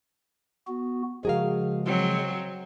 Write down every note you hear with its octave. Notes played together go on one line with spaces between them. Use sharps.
B3 F#4
C#3 F3 G#3 F#4 G#4 A#4 F5
F#3 C4 F#4